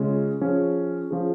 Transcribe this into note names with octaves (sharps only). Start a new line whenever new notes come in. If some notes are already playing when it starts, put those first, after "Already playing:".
Already playing: C#3 G#3 C#4 F4
F3 C#4 G#4
F3 C#4 G#4